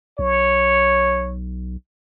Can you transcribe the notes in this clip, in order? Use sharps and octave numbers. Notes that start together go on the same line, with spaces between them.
B1 C#5